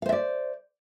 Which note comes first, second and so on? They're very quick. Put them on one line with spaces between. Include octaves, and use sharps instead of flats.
F5 C5 E5 D5